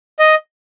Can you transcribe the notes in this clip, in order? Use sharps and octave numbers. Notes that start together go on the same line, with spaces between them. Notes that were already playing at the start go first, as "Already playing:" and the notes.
D#5